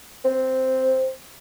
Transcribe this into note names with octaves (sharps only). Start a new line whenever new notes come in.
C4